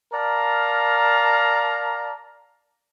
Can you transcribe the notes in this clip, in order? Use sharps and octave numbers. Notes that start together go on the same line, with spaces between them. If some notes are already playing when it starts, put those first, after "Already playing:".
A#4 D5 F5 A5 A#5